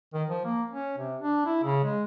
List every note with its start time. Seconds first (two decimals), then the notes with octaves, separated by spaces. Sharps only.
0.14 D#3
0.30 F3
0.45 A#3
0.71 C#4
0.98 C3
1.22 D4
1.46 E4
1.63 C#3
1.84 G#3